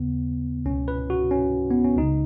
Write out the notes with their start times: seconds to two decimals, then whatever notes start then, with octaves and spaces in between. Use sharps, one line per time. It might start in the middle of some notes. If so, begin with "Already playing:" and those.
Already playing: D#2 C#3 B3
0.66 C#2 B2 C#4
0.88 B4
1.10 F#4
1.31 C#4
1.71 B3
1.84 C#4
1.97 C#2 C#3 D#4